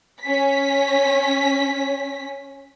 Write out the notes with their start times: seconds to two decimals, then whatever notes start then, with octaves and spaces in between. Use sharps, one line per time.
0.22 C#4 B6